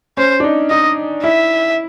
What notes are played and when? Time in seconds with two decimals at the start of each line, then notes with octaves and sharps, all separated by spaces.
0.17 C#4 C5
0.40 D4
0.44 D#4
0.70 D#4 D#5
1.24 E4 E5